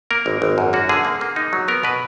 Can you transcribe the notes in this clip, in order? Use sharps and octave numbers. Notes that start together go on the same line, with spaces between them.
A#3 A#4
G#1
G#1
F#2
A#3 F#4
D3 G#4
A#3
A#3
D#4
F#3
B3 A#4
B2 B4